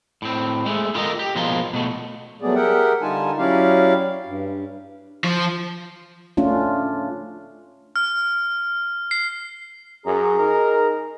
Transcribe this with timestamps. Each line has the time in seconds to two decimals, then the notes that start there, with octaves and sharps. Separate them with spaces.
0.22 A2 C4
0.66 G#3 A3
0.94 E4 F4 G4 A4 A#4 D#5
1.19 G4
1.35 B2 F3 G#3 A#3 F4 C6
1.73 B2 A3
2.42 F#3 G3 A3 B3 G#4 D5
2.55 G4 G#4 A#4 E5 F#5 G5
3.02 D3 G3 D#4 F4 G#5 A5
3.38 F#3 C#4 E4 G4 D5 F5
4.26 G2
5.24 F3
6.37 A3 C#4 D4 F4
7.96 F6
9.11 C7
10.06 F#2 G#4 A#5
10.39 D#4 A#4